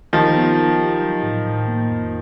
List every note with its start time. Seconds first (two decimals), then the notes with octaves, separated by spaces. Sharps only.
0.13 D#3 F3 G4
0.35 B3
0.57 D#4
0.79 G4
1.02 F#3
1.23 A2
1.46 A2
1.68 A#3
1.90 F2